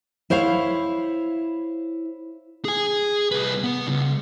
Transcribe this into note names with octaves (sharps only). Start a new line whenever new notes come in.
E4 C5 C#5 F5
G#4 G#5
C2 B4
B3
C#2